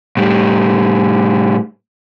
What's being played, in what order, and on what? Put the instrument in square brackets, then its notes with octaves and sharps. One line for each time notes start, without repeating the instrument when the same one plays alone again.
[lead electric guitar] A2 G3